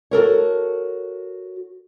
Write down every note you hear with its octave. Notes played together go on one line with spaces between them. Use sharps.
F#4 A4 A#4 C#5